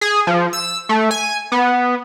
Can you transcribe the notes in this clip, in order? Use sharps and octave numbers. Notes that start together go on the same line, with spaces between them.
G#4
F3
E6
A3
G#5
B3